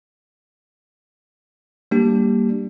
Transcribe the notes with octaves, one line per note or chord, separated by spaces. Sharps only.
G3 A#3 D4 G4